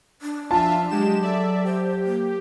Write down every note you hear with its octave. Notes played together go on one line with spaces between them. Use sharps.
D4
F3 F4 E5 A5
F#3 G#3 G4 E7
A4 D5 E5
G4 C5
A#3